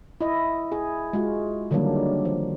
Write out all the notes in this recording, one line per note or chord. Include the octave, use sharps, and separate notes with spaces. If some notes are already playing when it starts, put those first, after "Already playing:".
E4 D#5
E4 G#4
G#3 F4 F#4
D3 D#3 F#3 G3 A#3 D4
F3